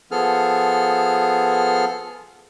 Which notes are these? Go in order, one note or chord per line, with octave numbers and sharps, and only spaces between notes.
F3 B3 G#4 A4 F6